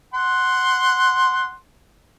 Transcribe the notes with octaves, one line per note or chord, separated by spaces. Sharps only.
F#5 C6